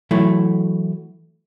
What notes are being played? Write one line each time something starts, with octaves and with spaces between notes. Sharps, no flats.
E3 F#3 A3 E4